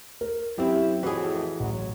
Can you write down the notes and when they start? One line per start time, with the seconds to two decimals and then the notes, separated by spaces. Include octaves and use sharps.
0.21 A#4
0.58 F#2 C4 E4 G4
1.03 F2 A2 E3 F#4 G#4
1.60 A1 F#3